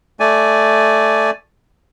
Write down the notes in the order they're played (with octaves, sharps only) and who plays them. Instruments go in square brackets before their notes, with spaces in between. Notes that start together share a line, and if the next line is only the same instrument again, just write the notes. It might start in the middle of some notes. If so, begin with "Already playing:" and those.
[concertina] A3 D5 G#5